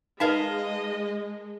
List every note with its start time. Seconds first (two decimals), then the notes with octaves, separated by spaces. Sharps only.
0.20 G#3 D#4 A#4 B4 D#5 F5 A5